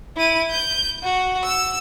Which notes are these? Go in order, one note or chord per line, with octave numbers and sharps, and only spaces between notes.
E4 D#7
G6
F#4
E6